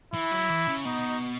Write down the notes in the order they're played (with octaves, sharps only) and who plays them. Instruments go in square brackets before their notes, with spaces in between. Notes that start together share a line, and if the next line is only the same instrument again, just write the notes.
[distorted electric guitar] E3 [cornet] E4
[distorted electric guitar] F#3
E3
C#3
[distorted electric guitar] B2 [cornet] D#4